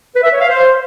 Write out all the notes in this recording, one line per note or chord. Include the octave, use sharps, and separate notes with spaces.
B4
E5
C#5
F5
C5